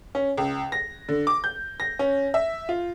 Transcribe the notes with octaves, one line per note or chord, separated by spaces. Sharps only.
C#4
C#2
A#6
D3
D6
G6
A#6
C#4
E5
F4